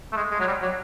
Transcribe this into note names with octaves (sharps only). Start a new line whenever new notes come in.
A3
G#3
G#3
F#3
G3
F#3